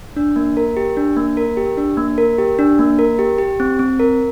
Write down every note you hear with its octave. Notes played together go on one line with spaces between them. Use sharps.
D4
A#3
A#4
G4
D4
A#3
A#4
G4
D4
A#3
A#4
G4
D4
A#3
A#4
G4
G4
C4
C4
A#4